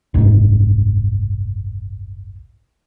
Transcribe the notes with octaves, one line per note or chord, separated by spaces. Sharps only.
F#1 C2 G#2